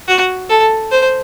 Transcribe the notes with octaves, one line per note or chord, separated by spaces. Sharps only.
F#4
A4
C5